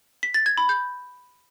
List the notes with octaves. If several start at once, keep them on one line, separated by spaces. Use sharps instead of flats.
B6
A6
G#6
B5
G6